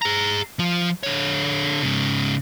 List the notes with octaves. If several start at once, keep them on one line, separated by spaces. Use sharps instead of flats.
G#4 A#5
F3 F4
D3 C#5
G#2 C#3